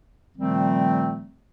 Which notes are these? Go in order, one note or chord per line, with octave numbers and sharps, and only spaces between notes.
A#2 D#3 F3 G3 A3 C4